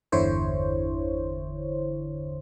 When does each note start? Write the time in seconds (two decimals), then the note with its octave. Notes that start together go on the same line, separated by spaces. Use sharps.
0.12 G1 E2 D3 E4 C5 C#5